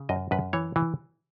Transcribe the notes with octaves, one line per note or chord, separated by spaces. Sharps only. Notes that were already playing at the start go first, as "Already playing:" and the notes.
Already playing: C#3
F#2 D#5
F#2 B4
E3 C#5
E3